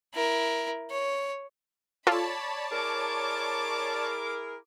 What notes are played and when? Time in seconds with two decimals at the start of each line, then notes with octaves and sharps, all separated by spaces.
0.14 E4 A#4
0.91 C#5
2.07 F4 A4 C#5 D5 A5 B5
2.72 E4 G#4 A#4 D6